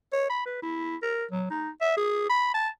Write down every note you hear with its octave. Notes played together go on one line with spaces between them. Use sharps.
C#5
B5
B4
E4
A#4
F#3
D#4
E5
G#4
B5
A5